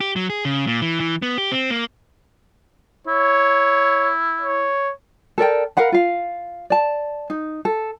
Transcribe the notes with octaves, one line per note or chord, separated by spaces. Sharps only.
G4
F#3
G#4
C#3
A#2
E3
E3
B3
G4
C4
A#3
E4 C#5
C#5
A4 A#4 D5 G5
A#4 F5 F#5 B5
F4 F5
D5 A5
D#4
A4